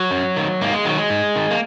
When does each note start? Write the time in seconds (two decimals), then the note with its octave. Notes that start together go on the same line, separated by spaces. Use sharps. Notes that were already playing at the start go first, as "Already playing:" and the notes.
Already playing: F#3
0.11 F#2
0.36 D#3
0.61 G#2 A#3
0.73 G#3
0.85 D#3 F#3
0.98 G#3
1.10 G#2
1.36 D#3
1.51 A#3